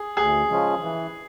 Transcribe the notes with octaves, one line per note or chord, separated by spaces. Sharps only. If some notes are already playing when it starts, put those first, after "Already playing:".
Already playing: G#4
D2 G#4
C#3 F3 G#3 C#4
E3